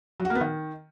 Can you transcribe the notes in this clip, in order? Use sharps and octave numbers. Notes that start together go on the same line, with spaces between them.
F#3
F#4
A#3
B3
D#3